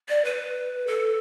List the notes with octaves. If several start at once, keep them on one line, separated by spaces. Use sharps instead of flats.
D5
B4
A4